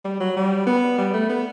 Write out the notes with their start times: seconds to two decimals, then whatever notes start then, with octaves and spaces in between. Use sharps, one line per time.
0.05 G3
0.20 F#3
0.37 G3
0.67 B3
0.98 G3
1.14 A3
1.30 B3